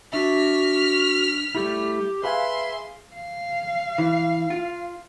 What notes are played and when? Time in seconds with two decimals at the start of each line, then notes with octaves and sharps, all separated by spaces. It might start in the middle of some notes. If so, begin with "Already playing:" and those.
0.13 D4 F#4 E5 F6 B6
1.55 G3 A3 E4 G4
2.24 G#4 B4 E5 F5 G#5 C6
3.14 F5
3.98 E3
4.50 F4